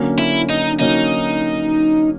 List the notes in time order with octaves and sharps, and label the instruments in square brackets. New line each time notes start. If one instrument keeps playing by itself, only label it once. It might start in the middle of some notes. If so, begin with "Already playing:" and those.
Already playing: [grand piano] D3 F#3 A#3 C#4
[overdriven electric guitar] E4
D#4
[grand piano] D3 F#3 A#3 C#4 [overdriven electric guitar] D#4